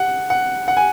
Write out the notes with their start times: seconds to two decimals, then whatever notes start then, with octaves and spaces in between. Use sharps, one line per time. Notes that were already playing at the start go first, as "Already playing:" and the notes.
Already playing: F#5
0.30 F#5
0.68 F#5
0.77 G#5